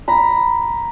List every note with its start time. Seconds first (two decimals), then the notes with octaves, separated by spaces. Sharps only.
0.08 A#5 B5